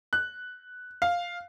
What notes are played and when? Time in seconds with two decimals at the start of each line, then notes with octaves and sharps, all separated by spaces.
0.13 F#6
1.02 F5